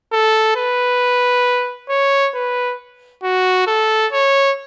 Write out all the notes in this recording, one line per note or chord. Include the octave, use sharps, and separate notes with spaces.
A4
B4
C#5
B4
F#4
A4
C#5